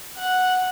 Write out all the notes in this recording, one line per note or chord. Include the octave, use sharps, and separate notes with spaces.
F#5